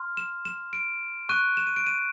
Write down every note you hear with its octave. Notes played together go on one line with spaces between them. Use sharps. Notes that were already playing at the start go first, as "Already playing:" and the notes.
Already playing: C6 F6
E7
E7
D7
C#6 F#6 D#7
E7
D#7
D7
D#7